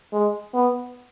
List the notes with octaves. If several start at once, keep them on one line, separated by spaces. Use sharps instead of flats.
G#3
B3